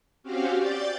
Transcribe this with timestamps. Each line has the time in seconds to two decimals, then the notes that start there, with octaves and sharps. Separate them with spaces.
0.23 C4 C#4 F#4 G4 F5
0.56 D5 G6 A6